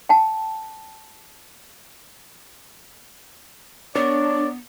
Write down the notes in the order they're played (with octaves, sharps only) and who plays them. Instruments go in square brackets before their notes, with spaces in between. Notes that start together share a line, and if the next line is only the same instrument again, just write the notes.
[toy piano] G5 A5
[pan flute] B3 [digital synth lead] D4 [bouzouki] A#4 C#5 [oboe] D5